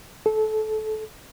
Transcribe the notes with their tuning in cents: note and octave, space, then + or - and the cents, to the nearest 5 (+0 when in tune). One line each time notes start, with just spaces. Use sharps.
A4 -25